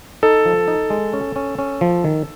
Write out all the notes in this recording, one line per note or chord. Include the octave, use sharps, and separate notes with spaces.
D#4 A4
F3
D#4
G#3
C#4
C#4
C#4
F3
D#3